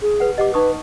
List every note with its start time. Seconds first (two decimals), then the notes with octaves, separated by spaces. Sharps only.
0.02 G#4
0.20 B4 F#5
0.38 G4 D#5 F#5 D6
0.54 D#4 B4 C#6 D#6